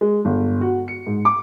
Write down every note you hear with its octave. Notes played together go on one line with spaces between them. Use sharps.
G#3
G1
F#4
C#7
G#2
D6